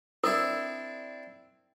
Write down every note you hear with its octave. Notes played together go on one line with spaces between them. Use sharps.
C4 D4 E4 A#4 D#6